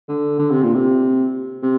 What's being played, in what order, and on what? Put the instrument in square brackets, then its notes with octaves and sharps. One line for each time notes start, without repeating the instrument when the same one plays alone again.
[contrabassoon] D3
D3
C3
A#2
C3
C3